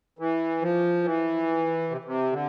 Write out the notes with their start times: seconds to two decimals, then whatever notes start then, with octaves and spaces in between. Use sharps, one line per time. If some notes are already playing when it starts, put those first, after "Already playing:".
0.19 E3
0.62 F3
1.04 E3
1.90 C3
2.05 C3
2.32 D3